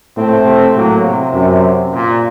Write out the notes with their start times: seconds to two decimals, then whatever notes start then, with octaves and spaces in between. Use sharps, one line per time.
0.17 A2 A3 C4
0.46 C3
0.75 A2 F#3 A#3
1.04 C3
1.34 F#2
1.92 A#2